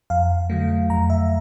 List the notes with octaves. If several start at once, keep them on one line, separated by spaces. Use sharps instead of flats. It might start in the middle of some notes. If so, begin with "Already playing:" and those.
F2 F5
D3 F#3 A3
F2 A#5
E5